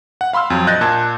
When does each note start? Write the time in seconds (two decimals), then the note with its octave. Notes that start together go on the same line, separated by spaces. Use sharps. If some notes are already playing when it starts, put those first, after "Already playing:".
0.21 F#5
0.33 F5 B5 C6 E6 F6
0.50 F2 F#3
0.67 A#1 D#5 F#6 G6 A6 A#6
0.81 A#2 A5 G#6